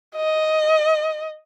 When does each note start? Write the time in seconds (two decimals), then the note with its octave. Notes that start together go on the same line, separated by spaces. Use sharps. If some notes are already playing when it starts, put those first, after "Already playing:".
0.16 D#5